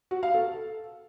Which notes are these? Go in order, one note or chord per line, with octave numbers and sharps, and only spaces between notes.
F#4
F5
A4